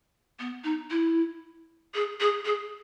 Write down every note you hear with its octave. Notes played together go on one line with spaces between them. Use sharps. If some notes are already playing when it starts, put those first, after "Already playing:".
B3
D#4
E4
G#4
G#4
G#4